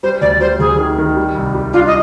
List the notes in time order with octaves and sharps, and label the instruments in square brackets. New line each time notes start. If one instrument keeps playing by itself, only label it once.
[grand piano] G3 [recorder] C5
[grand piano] D2 [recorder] D5
[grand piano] G3 [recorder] C5
[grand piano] D2 [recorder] G#4
[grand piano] D#3
D#3
G3
C2
G3
[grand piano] D4 [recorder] F4
[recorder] D#5